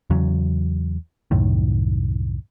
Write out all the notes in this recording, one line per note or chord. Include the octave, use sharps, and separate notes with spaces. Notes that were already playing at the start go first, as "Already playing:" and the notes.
E2 C#3 F#3
C2 F#2 A2 D#3